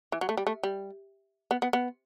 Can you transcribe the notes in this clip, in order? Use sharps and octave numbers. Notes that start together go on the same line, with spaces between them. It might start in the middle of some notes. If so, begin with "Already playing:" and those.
E3
F#3
A3
G3
A3
G3
B3
B3
B3